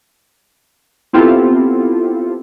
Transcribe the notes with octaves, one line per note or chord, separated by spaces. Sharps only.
B3 C4 E4 F4 G4 A4